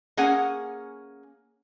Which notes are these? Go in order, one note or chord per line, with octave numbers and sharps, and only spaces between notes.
A#3 C#4 G#4 F#5 G#5